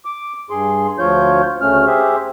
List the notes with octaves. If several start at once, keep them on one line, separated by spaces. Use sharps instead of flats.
D6
G2 G#4 C6
D2 F3 F4 C#5 G6
D2 C#3 A3 C#4 F6
G4 G#4 C5 E5